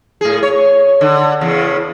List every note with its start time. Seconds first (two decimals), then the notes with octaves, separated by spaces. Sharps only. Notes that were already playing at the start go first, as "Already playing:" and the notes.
0.21 A2 G#4
0.43 C#5
1.01 D3
1.41 E2 C#3